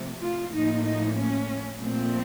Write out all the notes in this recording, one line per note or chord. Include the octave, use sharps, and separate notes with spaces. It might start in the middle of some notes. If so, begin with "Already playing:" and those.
Already playing: C3 F3 A3
F4
A2 F3 A#3 D#4
D#4
C#4
A#2 F3 A3 C4